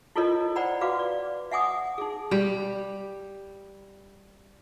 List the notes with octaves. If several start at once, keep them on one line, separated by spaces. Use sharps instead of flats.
E4 F4 A4 A#4 C#5 D#5
C5 D5 F#5 G5 A#5 B5
F#4 B4 F5 D6
D5
E5 F#5 G#5 D6 D#6
D#4 G#4
G3 G4